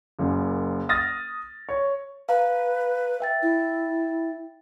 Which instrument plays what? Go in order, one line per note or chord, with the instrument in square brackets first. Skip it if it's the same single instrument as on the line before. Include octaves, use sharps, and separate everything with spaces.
[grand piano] F#1 F#2
D#6 F6 A6 A#6
C#5
[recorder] B4 [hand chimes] F5 A#5
[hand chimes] E5 G5 A6
[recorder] E4